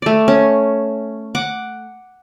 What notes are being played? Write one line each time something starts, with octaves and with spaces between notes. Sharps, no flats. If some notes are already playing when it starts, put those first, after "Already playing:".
A3 D5
C#4
F#5 D6